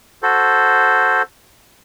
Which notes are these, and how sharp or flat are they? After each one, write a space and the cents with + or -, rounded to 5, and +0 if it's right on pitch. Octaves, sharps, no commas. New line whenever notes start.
F#4 +0 A4 +0 C5 +0